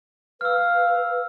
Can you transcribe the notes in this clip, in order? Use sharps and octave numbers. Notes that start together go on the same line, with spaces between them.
B4 F5 E6 F6